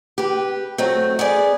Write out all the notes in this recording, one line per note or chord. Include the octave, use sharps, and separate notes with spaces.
G4 B4
F#3 A3 C4
B3 G#4 D5